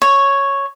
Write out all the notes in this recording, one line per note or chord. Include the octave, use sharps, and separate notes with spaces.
C#5